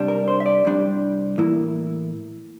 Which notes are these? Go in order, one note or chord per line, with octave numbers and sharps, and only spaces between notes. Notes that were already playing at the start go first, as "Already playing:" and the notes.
Already playing: C2 C3 G3 D4
A#4
C5
E5
D5
C2 C3 G3 D4
A2 E3 A#3 E4